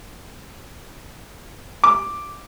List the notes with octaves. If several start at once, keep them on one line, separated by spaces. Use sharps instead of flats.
D6